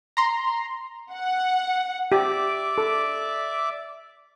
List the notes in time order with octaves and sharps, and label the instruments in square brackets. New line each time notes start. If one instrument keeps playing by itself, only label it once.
[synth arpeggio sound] A#5 C6
[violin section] F#5
[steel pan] G4 [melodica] D5 E5 D6
[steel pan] A4